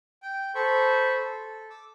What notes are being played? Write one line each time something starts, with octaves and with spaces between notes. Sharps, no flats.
G5
A4 C5 B5 C#6
A4
D6 E6